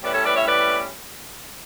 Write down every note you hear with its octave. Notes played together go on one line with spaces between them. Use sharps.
A2 G3 C#4 E4 B4 D5
A4 C#5
B4 D5
C#5 E5
B4 D5